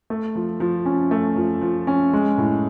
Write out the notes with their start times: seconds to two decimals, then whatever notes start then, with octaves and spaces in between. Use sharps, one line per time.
0.10 A3
0.35 F3
0.60 F3
0.86 C#4
1.11 A3
1.36 F3
1.62 F3
1.87 C#4
2.13 G#3
2.38 A2